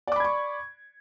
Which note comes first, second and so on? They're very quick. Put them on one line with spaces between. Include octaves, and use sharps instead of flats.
D5 D6 B5 G#6 C#6